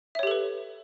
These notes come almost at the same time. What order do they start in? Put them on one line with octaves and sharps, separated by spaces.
E5 C#5 G4 A4 B4